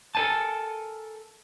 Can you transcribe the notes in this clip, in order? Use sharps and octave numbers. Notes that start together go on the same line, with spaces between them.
A4 A#4 C5 G#5 A5